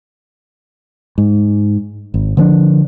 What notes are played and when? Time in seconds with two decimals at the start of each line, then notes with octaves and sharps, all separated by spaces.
1.18 G#2
2.14 G#1
2.37 D3 F3 A#3 D4